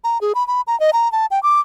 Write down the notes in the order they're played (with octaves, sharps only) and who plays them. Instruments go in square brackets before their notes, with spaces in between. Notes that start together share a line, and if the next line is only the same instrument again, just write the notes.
[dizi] A#5
G#4
B5
B5
A#5
D#5
A#5
A5
G5
D6